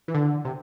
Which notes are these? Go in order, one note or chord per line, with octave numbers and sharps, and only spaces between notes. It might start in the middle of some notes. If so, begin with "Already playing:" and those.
E3
D3
C3